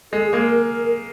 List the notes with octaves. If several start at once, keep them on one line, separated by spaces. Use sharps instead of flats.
G#3 A4
G#4
G#3 A#3
A#4
A#4